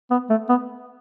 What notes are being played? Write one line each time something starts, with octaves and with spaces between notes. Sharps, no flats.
B3
A3
B3